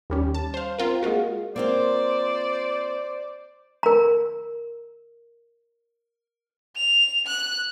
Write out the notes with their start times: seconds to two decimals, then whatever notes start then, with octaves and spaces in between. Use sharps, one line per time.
0.10 D#2 G3 C#4
0.35 A5
0.54 C5 F5
0.79 C4 F4 A#4
1.03 G#3 A#3 F4 F#4
1.56 A#3 C4 F4 C5 D5
3.83 A#4 A#5
6.76 F7
7.27 F#6